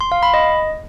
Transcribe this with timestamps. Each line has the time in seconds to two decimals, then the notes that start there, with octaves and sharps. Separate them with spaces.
0.01 C6
0.12 F5
0.23 B5
0.34 D#5